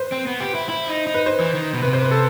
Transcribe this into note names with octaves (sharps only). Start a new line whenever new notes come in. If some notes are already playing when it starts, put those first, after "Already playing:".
Already playing: B4 C5
C4
B3
G4
E4
E4
D#4
D#4
B4
C5
E3
D#3
B2
C3 B4
C5
B4
A4